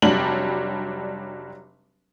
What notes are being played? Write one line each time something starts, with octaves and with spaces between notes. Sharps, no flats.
F1 F#3 G3 D4 F#7